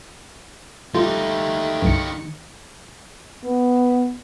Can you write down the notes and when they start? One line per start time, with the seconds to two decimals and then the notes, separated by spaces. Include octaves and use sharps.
0.94 G3 A3 D#4 F4 G4
1.82 C2 G2 D#3 C#7
3.44 B3